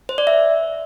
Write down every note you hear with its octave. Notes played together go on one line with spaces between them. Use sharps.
C5
D5
E5